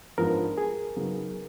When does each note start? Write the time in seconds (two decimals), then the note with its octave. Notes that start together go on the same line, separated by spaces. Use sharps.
0.18 G#2 F3 G#3 B3 D4 A#4
0.58 G#4
0.96 C#3 F#3 B3 D#4